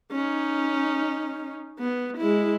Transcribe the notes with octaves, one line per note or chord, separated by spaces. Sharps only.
C#4 D#4
B3
G#3 E4